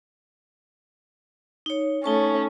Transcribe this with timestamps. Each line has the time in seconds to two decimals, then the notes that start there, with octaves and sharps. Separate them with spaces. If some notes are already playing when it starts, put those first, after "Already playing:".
1.66 D#4 C#5
2.04 A3 C#4 D#4 A5 C#6